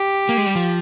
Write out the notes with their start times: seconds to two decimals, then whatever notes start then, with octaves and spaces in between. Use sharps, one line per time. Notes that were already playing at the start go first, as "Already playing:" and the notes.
Already playing: G4
0.29 A#3
0.37 G#3
0.46 G3
0.55 F3